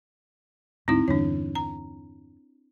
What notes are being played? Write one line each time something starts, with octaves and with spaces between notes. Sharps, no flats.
D2 G#2 C4 D#4 E4
E2 G2 D3 D4 C#5
A#5